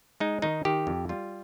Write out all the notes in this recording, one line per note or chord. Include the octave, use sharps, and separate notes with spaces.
G#3 D#4
D#3 D#4
D#3 G4
F2
G3 F4